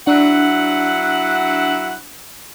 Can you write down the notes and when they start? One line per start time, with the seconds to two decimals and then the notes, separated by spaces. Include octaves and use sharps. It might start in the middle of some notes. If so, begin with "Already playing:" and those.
0.07 F#3 D4 E4 F#5